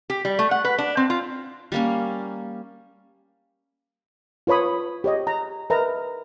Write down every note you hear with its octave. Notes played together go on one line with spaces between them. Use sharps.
G4
G3
A3
F#5
B4
D4
C4
F4
G3 A#3 C#4
F4 B4 C#5 B5 D#6
G4 C#5 D#5
A#5
A#4 B4 D#5 E5 A#5